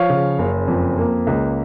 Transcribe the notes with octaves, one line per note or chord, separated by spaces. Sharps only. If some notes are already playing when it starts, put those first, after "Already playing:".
Already playing: F3 C#5 F5
C#3
F#1
F2
A#3
C#2